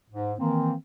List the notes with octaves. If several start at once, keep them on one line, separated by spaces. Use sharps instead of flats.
G#2
D#3 E3 A#3 C4